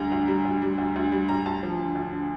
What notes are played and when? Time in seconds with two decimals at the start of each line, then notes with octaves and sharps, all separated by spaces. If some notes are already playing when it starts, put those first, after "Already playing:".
Already playing: D2 D3 G3 A#5
0.12 D2
0.28 G3
0.45 D2
0.62 G3
0.78 D2
0.96 D2
1.12 G3
1.28 D2 A#5
1.46 D2 A5
1.63 F3
1.79 D3
1.95 D2
2.13 D3